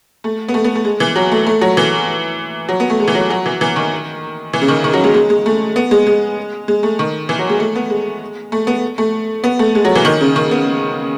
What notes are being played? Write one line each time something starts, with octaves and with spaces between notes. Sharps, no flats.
A3
B3
A3
B3
A3
G#3
E3
F#3
A3
A3
F#3
E3
F#3
B3
A3
G#3
E3
F#3
F#3
E3
E3
D#3
E3
C#3
D#3
D#3
F#3
G#3
G#3
G#3
A3
B3
G#3
G#3
G#3
A3
D#3
E3
F#3
G#3
A3
B3
G#3
A3
B3
A3
B3
A3
G#3
F#3
E3
D#3
C#3
D#3
B3